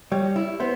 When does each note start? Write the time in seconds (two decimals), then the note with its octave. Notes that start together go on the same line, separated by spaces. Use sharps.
0.11 G3 C#5
0.36 E4
0.60 B3 C5